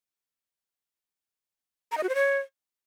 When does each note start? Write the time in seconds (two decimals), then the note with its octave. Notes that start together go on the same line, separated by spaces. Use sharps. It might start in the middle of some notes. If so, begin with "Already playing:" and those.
1.92 A#5
1.97 D#5
2.03 F#4
2.09 C5
2.15 C#5